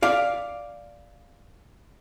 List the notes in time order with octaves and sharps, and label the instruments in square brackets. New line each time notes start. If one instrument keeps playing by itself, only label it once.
[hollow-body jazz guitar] D5 F5